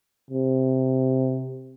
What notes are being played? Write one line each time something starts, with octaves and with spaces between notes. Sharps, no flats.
C3